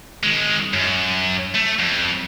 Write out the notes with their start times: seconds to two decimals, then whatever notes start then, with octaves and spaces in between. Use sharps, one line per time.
0.23 D#3 G#3
0.73 F#2
1.55 A3
1.79 F2